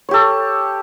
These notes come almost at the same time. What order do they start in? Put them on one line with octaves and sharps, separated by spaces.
C#5 G4 A4